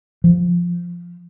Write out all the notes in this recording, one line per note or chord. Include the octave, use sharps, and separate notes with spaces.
F3